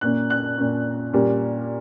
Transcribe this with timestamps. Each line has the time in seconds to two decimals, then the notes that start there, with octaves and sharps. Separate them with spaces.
0.01 A#2 A#3 C#4 F#6
0.30 F#6
0.58 A#2 A#3 C#4
1.13 A#2 G3 A#3 C#4